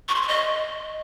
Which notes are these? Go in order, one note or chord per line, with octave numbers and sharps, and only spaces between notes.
C#6
C6
C#6
D#5